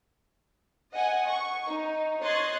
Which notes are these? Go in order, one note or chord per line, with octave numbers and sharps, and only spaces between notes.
D#5 F#5 G#5
C#6
D#4
C#5 D#5 C6 F#6 G#6 A6